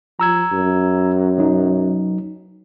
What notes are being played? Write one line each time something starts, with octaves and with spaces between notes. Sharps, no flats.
F3 A#5 E6 G#6
F#2
F#3 D#4